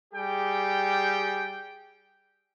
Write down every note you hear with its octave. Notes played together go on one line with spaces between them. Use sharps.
G3 G4 G#4 G5